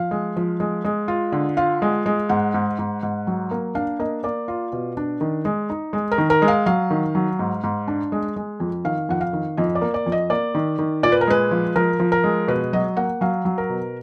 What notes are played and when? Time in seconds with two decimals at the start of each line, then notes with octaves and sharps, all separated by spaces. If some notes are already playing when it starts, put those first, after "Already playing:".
Already playing: F3 F5
0.11 G#3
0.36 F3
0.60 G#3
0.85 G#3
1.08 F4
1.32 D3
1.57 F4 F5
1.82 G#3
2.06 G#3
2.29 G#2 F#5
2.54 G#2
2.79 G#2
3.03 G#2
3.27 F#3
3.51 A#3
3.75 D4 F5
3.99 A#3 D#5
4.24 A#3 D5
4.48 F4
4.72 B2
4.97 D4
5.21 D#3
5.45 G#3
5.70 D#4
5.93 G#3
6.12 A#4
6.18 D#3
6.30 A#4
6.42 G#3
6.48 F5
6.66 F#3 F5
6.90 D#3
7.15 F#3
7.39 G#2
7.64 G#2
7.88 D4
8.12 G#3
8.36 G#3
8.60 F2
8.85 D#3 F5
9.09 F2 F#5
9.21 F5
9.33 D#3
9.57 F2 D#5
9.75 D5
9.81 A#3
9.94 D5
10.06 F2
10.12 D#5
10.30 A#3 D5
10.55 D#3
10.79 D#3
11.03 A#2 D5
11.12 B4
11.21 A#4
11.28 G#3 B4
11.51 F3
11.76 F3 A#4
12.00 F3
12.12 A#4
12.24 G#3
12.48 B2 B4
12.73 F#3 D#5
12.97 A#3 F#5
13.21 F#3 F5
13.45 F#3
13.58 A#4
13.69 B2